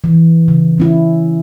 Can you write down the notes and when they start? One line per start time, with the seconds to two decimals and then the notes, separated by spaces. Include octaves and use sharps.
0.04 E3
0.48 C#3
0.78 C#3 C#4 E4